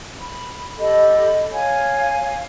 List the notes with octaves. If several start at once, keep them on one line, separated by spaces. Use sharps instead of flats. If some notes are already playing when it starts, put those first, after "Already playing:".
B5
G4 A4 D#5 B5
C#5 F5 G#5